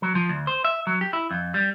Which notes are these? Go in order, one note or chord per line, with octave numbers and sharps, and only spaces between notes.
F#3
F3
D2
C5
E5
F#3
G4
E4
F2
G3